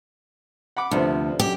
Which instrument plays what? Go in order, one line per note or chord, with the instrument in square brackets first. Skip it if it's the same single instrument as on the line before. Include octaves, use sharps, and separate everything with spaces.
[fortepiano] F#5 B5 D6
[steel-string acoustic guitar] D2 [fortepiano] C3 F3 B3
[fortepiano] F#2 [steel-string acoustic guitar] G4